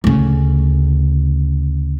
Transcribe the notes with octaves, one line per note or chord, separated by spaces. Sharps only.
D2 C#3